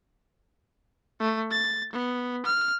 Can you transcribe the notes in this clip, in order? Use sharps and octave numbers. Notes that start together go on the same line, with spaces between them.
A3
A6
B3
F6